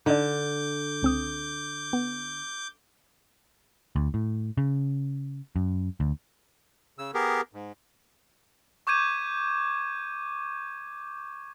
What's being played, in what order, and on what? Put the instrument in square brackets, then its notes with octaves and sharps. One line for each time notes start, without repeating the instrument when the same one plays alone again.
[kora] D3 [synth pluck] D#4 D5 [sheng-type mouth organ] D6 G6
[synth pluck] C#2 C4 D#6
B3
[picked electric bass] D2
A2
C#3
F#2
D2
[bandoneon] C#3 E6
B3 G4 G#4 A#4
G#2
[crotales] C#6 D6 G6 G#6 D#7